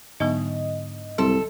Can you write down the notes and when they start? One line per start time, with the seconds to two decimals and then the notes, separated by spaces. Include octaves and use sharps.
0.20 G#2 D3 F#3 B3 D#4 D#5
1.18 C2 F#3 A4 C6